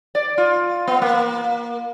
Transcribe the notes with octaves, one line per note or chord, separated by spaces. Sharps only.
D5
F4
B3
A#3